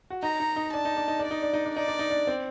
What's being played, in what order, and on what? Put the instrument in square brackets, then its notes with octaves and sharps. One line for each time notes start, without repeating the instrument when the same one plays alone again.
[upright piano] F#4
[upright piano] D#4 [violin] A#5
[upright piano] D#4
D#4
[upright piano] D4 [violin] A5
[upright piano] D#4
D4
D#4
D4
[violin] D5
[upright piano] D#4
D4
D#4
D4
[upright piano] D#4 [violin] D5
[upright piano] D4
D#4
D4
C4